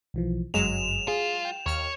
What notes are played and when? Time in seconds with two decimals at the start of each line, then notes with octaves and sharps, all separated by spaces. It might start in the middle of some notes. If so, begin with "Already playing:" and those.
0.14 B1 E3 F3
0.54 G1 F#2 F#3 G#3 E7 F7
1.08 F4 G#4
1.45 G5
1.66 D#2 C#5 F6